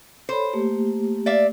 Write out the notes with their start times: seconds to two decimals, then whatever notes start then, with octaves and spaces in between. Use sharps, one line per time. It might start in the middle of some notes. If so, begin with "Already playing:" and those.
0.29 A4 C5 C#5 B5
0.53 A3 A#3 G4
1.26 D5 E5 F5